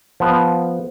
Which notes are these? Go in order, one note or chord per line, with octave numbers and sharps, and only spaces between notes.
F3 B3